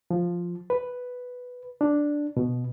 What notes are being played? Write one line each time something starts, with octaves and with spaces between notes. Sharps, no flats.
F3
B4
D4
B2